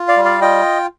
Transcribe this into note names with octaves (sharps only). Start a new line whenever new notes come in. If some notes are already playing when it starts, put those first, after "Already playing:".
Already playing: F4
D5 F5
G3
D5 F5
F4 D#5 G5